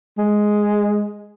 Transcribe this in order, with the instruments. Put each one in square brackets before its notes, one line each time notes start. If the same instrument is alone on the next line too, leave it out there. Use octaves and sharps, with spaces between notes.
[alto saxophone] G#3